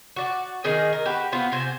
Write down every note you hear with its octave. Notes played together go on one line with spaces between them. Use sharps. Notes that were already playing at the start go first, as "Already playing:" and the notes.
F#4 D5
D#3 D#4 G#4 A#4
A#4
F#4 G4 B4
B3 F4 C5
C3 C5 G#5